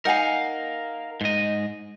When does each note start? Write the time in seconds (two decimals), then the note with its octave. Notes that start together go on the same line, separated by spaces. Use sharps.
0.05 D#4 A#4 F5 F#5 G#5
1.21 G#2 D#5